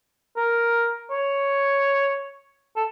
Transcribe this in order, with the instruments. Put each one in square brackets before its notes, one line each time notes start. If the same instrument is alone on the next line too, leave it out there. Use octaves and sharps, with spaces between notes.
[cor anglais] A#4
C#5
A4